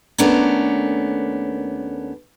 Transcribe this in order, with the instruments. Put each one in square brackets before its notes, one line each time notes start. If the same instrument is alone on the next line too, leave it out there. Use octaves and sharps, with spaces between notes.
[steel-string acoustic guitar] D#2 A3 B3 C#4 D4 A#4